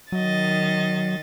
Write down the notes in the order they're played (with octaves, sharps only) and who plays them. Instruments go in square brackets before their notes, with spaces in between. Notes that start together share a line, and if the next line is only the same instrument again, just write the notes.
[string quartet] D#3 D#5 A6 [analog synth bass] F#3